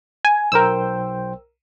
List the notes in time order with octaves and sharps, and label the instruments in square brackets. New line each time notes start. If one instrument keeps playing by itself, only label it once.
[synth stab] G#5
[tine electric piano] B1 C5 G5 [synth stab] A#4 E6